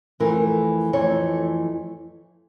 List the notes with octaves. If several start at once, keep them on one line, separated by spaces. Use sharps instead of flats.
F2 E3 A3 A#4
F2 E3 A3 C#5